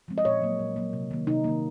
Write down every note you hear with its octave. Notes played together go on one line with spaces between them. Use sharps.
F3 G#3 C4
D#5
A#2 C#5
F#3 A#3
A#2
F#3 A#3
C3
D#3 A#3
C3 D#4
D#3 A#3